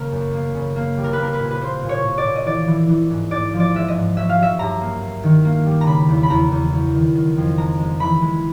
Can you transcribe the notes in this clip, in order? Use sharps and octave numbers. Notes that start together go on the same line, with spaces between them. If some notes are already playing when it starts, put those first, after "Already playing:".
Already playing: C#3 A#3 A#4
F#2
A#3
C#3
A#3
G3
A#4
B4
A#3 A#4
B4
A#2
B4
A#3 C5
A#2
C#5
A#2
D5
A#2
D#5
E3 D5
E3
E3
G#2
G#2 D5
F3
D5
G#3 E5
D#5
G#2
F#3 E5
F5
F#3 E5
G2 A#5
A#3
A#3
D#3
A#3
G3
A#5
C#3 B5
E2
B5
E2 A#5
E2
F#3
D#3
D#3
F2
G#3 A#5
G#3
E3 B5
G#3